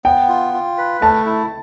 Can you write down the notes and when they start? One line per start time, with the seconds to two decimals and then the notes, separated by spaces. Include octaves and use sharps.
0.05 B3 G5
0.29 F4
0.53 F4
0.78 B4
1.01 A3 A5
1.26 E4